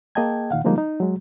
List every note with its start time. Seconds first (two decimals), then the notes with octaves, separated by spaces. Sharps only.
0.15 A#3 G#4 D#5 G5 A5 G#6
0.50 A#2 D#3 F5 F#5
0.64 D3 F3 G3 G#3 A#3 D#4
0.78 D#4
1.00 F#3 G#3